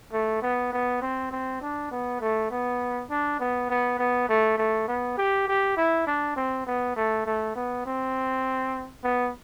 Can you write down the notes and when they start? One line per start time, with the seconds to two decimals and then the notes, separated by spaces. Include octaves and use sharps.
0.13 A3
0.42 B3
0.73 B3
1.02 C4
1.31 C4
1.62 D4
1.91 B3
2.21 A3
2.51 B3
3.10 D4
3.40 B3
3.70 B3
3.99 B3
4.29 A3
4.58 A3
4.88 B3
5.18 G4
5.48 G4
5.77 E4
6.07 D4
6.36 C4
6.67 B3
6.96 A3
7.26 A3
7.56 B3
7.86 C4
9.04 B3